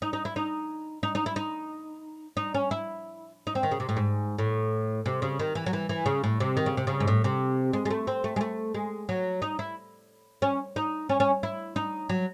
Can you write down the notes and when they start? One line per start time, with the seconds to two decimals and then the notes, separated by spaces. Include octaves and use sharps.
0.02 D#4
0.13 D#4
0.25 E4
0.36 D#4
1.03 D#4
1.15 D#4
1.26 E4
1.36 D#4
2.37 D#4
2.54 C#4
2.71 E4
3.47 D#4
3.55 C4
3.63 D#3
3.71 C#3
3.80 C3
3.89 A2
3.97 G#2
4.38 A2
5.06 C3
5.22 C#3
5.39 D#3
5.55 E3
5.66 F#3
5.73 E3
5.89 E3
6.06 C#3
6.24 A2
6.40 C3
6.57 D#3
6.66 C#3
6.77 C3
6.87 C#3
7.00 G#2
7.07 A2
7.24 C3
7.73 G#3
7.85 G#3
7.90 A3
8.07 C4
8.24 A3
8.36 G#3
8.41 A3
8.74 G#3
9.09 F#3
9.42 D#4
9.59 E4
10.42 C#4
10.76 D#4
11.09 C#4
11.20 C#4
11.43 E4
11.76 D#4
12.09 F#3